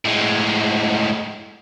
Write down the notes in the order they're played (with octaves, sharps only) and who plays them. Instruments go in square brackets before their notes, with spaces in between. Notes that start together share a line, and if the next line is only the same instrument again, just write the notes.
[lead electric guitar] A2 G#3